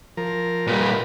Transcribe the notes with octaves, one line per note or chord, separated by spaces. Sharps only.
F3 A#4
A#2 G3 A#3 B4